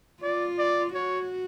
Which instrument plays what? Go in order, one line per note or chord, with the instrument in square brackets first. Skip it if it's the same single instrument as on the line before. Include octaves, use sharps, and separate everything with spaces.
[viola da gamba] F4 [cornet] D5
[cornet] D5
[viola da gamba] F#4 [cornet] C#5